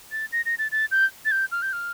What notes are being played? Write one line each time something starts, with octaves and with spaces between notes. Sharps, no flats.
A6
A#6
A#6
A6
A6
G6
A6
G6
F6
G6
F6